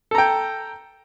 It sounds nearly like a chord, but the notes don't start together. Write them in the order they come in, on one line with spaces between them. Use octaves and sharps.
A4 A#5 G5